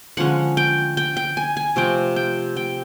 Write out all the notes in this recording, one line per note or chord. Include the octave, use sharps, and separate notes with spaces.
D3 F3 G#3 C#4 F#5
G5
G5
G5
G#5
G#5
C3 F3 A3 C4 G5
G5
G5